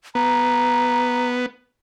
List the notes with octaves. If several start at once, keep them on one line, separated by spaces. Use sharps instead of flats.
B3 A#5